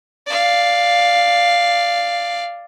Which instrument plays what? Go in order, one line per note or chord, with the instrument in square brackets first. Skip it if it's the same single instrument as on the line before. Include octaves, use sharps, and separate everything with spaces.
[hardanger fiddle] D5 F5